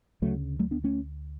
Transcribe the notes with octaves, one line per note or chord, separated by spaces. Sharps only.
D2 C#3 F#3 A3
F#3 A3
B3 D4
A3 C#4